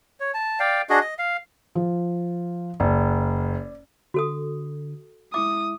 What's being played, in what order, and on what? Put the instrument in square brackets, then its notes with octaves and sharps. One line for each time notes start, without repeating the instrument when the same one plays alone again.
[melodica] C#5
A5
D5 F5 G5
D4 F#4 G#4 D#5
D#5
F5
[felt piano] F3
[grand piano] F#1 [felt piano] D5
[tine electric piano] D3 [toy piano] F#4 A4 D#6
[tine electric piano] G#3 E4 E5 [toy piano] D6 [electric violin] D#6